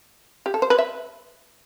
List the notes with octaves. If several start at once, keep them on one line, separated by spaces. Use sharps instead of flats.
G4
A4
C5
B4
E5